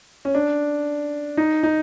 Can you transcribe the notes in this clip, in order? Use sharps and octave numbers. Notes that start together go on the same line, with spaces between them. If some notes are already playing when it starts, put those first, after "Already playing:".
C#4
D4
D#4
D#4